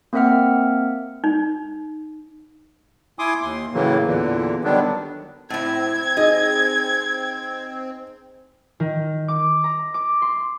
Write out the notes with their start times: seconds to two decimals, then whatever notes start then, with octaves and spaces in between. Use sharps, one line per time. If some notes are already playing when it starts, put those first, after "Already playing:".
0.13 A#3 C4 A#4 E5 F#5 F6
1.24 D#4
3.19 E4 G#5 C6 D6 D#6
3.42 D#2 C6
3.73 A2 C#3 E3 F#3 A#3
4.07 E2 A#2 D3 E3
4.64 D3 D#3 F#3 G3 B3 D4
5.50 A2 C4 E4 G#6
6.17 D#4 G#4 D#5
8.80 D#3
9.28 D6
9.64 A#5
9.94 D6
10.22 C6